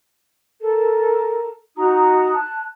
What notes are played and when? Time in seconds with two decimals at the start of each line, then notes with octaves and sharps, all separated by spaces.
0.60 A4 A#4
1.77 D#4 F#4 A#5 D#6
2.34 A5 F#6